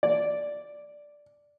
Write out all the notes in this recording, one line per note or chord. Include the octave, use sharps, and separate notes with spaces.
D5